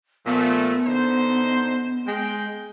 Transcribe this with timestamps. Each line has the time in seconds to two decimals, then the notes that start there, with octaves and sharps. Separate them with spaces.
0.26 A#2 F3 A3 B3
0.85 D3 D#4 C5
2.07 G#3 G5